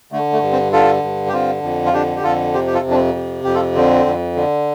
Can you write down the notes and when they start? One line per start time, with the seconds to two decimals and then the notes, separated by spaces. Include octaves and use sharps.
0.12 D3 A3
0.32 A3
0.42 G2
0.52 C4
0.73 D3 F4 A4
1.03 G2
1.29 G4
1.33 D3 C4 F4
1.63 F2
1.86 F4
1.93 D3 D4 G4
2.16 G4
2.23 F2 F4 A4
2.54 C3 G4 C5
2.67 G4
2.74 F4 A4
2.85 F2
2.90 D4
2.94 C4
3.15 C3
3.44 F2 G4
3.55 F4 A4
3.75 D3 C4
4.06 F2
4.36 D3